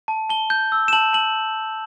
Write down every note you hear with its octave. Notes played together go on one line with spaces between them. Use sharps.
A5
A5 G7
G6
E6
E7
A5 F#7
A5 F#7